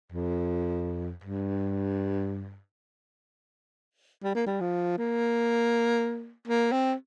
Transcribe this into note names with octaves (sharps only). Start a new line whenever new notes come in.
F2
G2
G3
A#3
G3
F3
A#3
A#3
C4